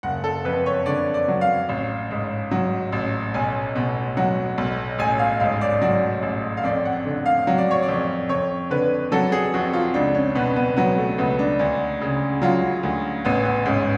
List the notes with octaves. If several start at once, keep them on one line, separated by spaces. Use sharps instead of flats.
F#1 F#5
A4
F2 B4
C#5
D3 D5
D5
F#3
F5
A1
G#2
F#3
A1
B1 G#5
B2
F#3 F#5
B1
A1 G#5
F5
G#2 F5
D5
F#3 D5
A1
F5
F2 D5
F#5
D3
F5
F#3 F5
D5
C#5
D5
F2
F2 C#5
D3 B4
F#3 A4
G#4
F2 F#4
F4
C#2 D4
C#4
B2 B3
B3
F#3 B3
A3
C#2 B3
D4
D2 D4
C#3
F#3 F4
D2
A1 B3
B3
G#2 C#4